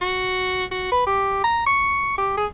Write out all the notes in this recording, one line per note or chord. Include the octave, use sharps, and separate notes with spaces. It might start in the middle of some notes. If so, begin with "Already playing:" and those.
F#4
F#4
B4
G4
A#5
C#6
G4
G#4